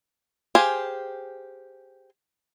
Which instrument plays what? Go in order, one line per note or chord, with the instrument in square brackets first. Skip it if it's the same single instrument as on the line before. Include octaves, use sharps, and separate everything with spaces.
[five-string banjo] G4 G#4 C5 F5 G#5